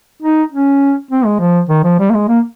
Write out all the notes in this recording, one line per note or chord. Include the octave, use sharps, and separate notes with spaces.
D#4
C#4
C4
G#3
F3
D#3
F3
G3
A#3
G#3
A#3